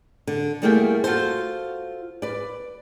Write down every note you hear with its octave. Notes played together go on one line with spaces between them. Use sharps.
D3
E2 G3 A3 A#3 G#4 G5
F4 F#4 A4 C5
B4 D5